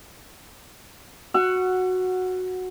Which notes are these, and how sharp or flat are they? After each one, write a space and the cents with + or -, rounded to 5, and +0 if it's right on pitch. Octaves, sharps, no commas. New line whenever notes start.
F#4 -5 F#5 +0 E6 +40